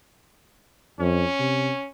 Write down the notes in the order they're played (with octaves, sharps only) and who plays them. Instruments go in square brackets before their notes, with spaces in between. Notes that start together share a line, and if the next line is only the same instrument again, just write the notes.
[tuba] F2 [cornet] C#4
[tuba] C3